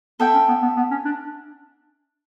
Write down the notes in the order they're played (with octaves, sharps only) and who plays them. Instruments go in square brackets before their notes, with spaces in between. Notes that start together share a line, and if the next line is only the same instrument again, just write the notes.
[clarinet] B3 [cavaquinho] A4 E5 G5
[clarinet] C#4
B3
B3
B3
C#4
D4